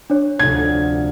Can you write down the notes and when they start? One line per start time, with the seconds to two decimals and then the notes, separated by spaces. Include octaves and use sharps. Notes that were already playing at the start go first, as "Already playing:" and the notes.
0.10 D4 C#5
0.39 F1 D2 G#6